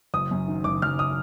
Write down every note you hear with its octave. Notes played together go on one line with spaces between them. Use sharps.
F#1 D#6
F#2
D#3
F#1 D6
F#1 F6
D#6